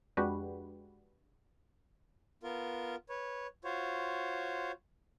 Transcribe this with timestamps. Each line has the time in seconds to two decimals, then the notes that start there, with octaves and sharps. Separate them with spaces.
0.17 F2 G#3 D4 F#4 G4 B4
2.43 B3 F4 A#4
3.09 B4 C#5
3.64 F4 F#4 C5 C#5